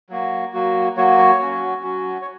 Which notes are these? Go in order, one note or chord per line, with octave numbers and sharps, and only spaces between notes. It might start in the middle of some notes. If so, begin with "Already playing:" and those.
F#3 A#3 F#4
F#3 A#3 F#4
F#3 A#3 F#4 C#5
C#5
F#3 C#4 F#4
F#3 C#4 F#4
C#5